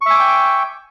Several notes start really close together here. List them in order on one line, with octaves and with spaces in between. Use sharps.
C#6 E5 G#5 D6 G5